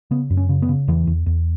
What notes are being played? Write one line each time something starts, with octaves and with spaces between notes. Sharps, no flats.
C#3 B3
F#2
C#4
C#3
B3
C#3
E2 E3
E2
E2